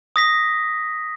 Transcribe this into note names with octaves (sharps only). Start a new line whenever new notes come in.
D#6 A#6 B6